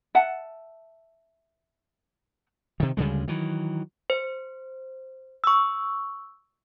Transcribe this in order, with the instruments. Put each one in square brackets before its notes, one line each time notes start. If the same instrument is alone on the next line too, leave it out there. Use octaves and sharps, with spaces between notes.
[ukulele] E5 F#5 A5
[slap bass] C3 D#3
D2 C#3 G3 G#3
D#3 E3 F#3
[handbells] C5
C#6 E6